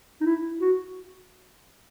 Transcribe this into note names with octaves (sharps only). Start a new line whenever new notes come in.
D#4
E4
F#4